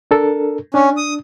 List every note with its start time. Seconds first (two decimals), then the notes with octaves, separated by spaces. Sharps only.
0.11 D4 A4 A#4
0.74 C#4 D4
0.97 D#6